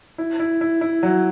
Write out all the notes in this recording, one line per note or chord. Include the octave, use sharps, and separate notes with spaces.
E4
E4
E4
E4
F#3